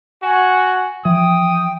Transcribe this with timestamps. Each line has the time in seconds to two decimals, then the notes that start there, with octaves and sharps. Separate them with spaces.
0.23 F#4 G#5
1.05 E3 F3 G5 D#6